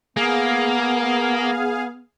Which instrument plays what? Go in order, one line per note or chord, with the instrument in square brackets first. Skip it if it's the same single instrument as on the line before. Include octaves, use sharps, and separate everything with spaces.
[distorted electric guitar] A#3 [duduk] B3 [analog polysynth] G#4 F5